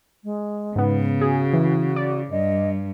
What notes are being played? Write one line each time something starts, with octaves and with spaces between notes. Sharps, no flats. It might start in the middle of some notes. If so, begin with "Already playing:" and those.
G#3
G#2 C#3 B3
F#4 G#4
E3
D5
G2 D#5